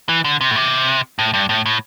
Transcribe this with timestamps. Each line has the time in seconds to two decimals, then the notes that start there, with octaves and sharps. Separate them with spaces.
0.09 E3
0.24 D3
0.41 C3
0.51 A2
0.56 C3
1.19 A2
1.34 G2
1.49 A2
1.66 A2